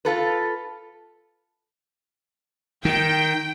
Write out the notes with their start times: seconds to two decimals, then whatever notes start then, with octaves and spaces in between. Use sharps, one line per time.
0.05 F4 A4 B4
2.85 D#3 G5